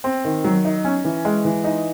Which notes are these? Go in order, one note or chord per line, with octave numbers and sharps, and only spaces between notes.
C4
D#3
F#3
D#4
C#4
E3
G#3
E3
D#4